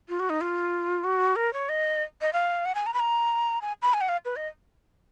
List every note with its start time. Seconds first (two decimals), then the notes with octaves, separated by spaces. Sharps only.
0.09 F4
0.20 F#4
0.30 D#4
0.41 F4
1.04 F#4
1.36 A#4
1.53 C#5
1.69 D#5
2.21 D#5
2.33 F5
2.65 F#5
2.75 G#5
2.86 A#5
2.94 B5
3.00 A#5
3.62 G#5
3.82 B5
3.94 G#5
4.01 F#5
4.09 F5
4.25 B4
4.36 D#5